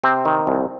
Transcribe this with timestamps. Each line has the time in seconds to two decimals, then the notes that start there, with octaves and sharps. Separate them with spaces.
0.03 C3 C4
0.25 D#3
0.47 C2